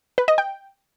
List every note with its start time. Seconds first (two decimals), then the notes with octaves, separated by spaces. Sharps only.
0.18 B4
0.28 D#5
0.38 G5